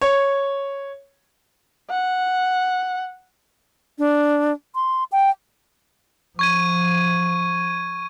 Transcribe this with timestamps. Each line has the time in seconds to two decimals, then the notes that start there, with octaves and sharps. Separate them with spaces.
0.01 C#5
1.90 F#5
3.98 D4
4.75 C6
5.12 G5
6.39 F3 C#6 G#6 D#7